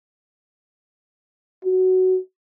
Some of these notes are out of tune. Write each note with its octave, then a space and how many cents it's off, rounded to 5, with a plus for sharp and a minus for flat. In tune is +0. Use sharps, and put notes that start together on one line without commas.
F#4 +10